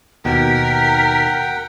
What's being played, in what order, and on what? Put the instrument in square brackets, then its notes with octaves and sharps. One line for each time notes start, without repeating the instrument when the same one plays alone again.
[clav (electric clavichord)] D#2 B2 [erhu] A#4 [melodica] F#5 G5 [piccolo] B6